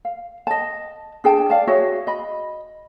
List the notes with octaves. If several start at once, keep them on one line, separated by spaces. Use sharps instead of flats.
F5
D#5 A5
D4 G#4 G5 A5
D5 F5 A5
F#4 G#4 C#5 E5
D#5 B5